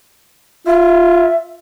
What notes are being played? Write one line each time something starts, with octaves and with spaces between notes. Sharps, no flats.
F4 E5